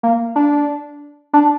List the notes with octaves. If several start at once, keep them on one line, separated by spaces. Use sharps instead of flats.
A#3
D4
D4